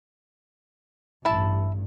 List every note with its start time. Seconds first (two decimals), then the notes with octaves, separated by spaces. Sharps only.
1.25 A1 G2 E4 A5